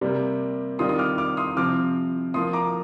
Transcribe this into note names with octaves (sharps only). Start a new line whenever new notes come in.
C3 G3 A#3
D#3 G3 C4 F4 C6 D#6
D#6
D6 F6
D6 F6
C6 D#6
C3 F3 C4 D6 F6
F3 A#3 F4 C6 D#6
A#5 D6